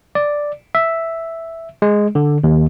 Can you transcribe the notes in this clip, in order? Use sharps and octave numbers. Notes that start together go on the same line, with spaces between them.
D5
E5
G#3
D3
D#2